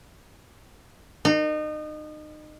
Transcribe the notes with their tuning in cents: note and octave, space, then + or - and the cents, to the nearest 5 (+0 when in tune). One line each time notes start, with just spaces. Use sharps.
D#4 -30